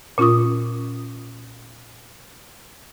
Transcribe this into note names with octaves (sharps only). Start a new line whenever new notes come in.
A#2 C#4 F4 C#6 D#6